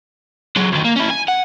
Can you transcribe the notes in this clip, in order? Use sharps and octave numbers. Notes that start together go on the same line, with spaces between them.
F#3 G#3
D2 D#3
A#3
C#4 E4
G#5
F#5